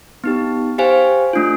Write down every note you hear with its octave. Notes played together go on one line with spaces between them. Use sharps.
B3 D#4 G4
G4 C5 F5 G#5
A3 D4 F4